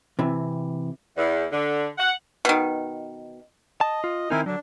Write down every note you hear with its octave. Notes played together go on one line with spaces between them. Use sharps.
C3 E3
E2
D3
F#5
B2 D#3
D#5 A5
F4
D#3 C4 D#4 E4 A#4 G#5
D3 F#3 D4